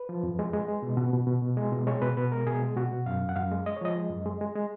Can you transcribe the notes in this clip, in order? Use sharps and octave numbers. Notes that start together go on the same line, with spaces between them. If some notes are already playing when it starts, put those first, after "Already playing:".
Already playing: B4
F3
F2
G#3
G#3
G#3
B2
B2
B2
B2
B2
G#3
B2
G#3 C#5
B2 B4
B2 B4
G#3 A#4
B2 G#4
G#3
B2 F#4
B2
F#2 F5
F#2
F#5
F#2 F5
G#3
G#3 D#5
C#5
F3 D#5
G#3
F#2
G#3
G#3
G#3